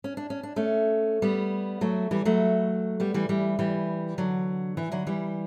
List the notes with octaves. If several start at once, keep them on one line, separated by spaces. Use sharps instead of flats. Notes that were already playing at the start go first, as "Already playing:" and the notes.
C#4
D4
C#4
D4
A3 C#4
G3 B3
F#3 A3
E3 G3
F#3 A3
G3 B3
E3 G3
E3 G3
E3 G3
D3 F#3
E3
D3 F#3
E3 G3